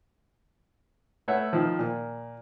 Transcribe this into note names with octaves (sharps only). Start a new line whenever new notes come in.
A3 B4 C#5 E5 F#5
D#3 F3
A#2